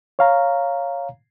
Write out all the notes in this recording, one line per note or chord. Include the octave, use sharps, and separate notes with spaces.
C#5 F5 A#5